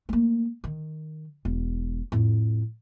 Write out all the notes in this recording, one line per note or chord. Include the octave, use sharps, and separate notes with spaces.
A3 A#3
D#3
E1
F2 A2